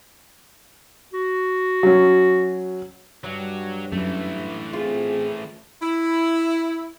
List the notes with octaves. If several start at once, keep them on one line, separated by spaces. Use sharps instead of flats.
F#4
F#3 C#4
G2 F#3
F#2 E3 A3
C4 F4 G#4
E4